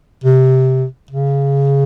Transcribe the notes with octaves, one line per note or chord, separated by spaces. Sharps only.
C3
C#3